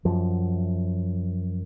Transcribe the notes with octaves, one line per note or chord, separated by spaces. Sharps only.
F#2 F3